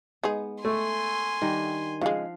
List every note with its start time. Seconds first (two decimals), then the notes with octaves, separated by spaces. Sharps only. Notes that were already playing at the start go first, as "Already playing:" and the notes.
0.23 G#3 B3 D#4 G#4
0.65 A3 G#5 C6
1.41 D#3 G3 D4
2.01 C#3 F3 G#3 F5 F#5